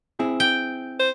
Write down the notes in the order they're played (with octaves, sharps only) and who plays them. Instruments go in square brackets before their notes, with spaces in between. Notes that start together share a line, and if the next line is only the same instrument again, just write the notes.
[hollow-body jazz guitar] C4 E4 G#4
[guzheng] G5
[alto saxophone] C5